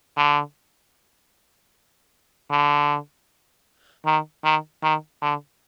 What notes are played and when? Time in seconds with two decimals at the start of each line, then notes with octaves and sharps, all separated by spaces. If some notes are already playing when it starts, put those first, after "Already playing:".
0.17 D3
2.51 D3
4.06 D#3
4.44 D#3
4.83 D#3
5.22 D3